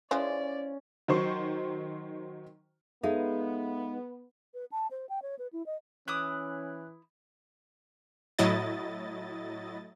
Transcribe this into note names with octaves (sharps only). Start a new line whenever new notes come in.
E3 F3 G#3 C#4 D5
D#3 F#3 C5 C#6
G#3 B3 D#4 A4 E5 F5
B4
A5
C5
G5
C#5
B4
E4
D#5
E3 C#4 E4 D6 D#6 F#6
A2 F#3 E4 D#5 A6